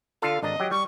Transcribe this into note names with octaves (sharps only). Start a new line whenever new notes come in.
D3 F4 A4 F5
G#1 D4 D#5 A#5
F#3 G4
G3 C#6